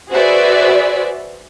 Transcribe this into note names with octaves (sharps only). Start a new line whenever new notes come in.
F#4 G#4 B4 C5 D5 E5